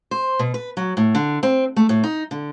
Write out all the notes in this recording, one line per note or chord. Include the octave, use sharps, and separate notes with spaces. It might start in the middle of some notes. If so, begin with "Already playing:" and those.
C5
B2
B4
F#3
A2
D3
C4
A3
A2
D#4
D3